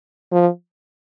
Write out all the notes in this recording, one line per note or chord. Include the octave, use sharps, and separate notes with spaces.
F3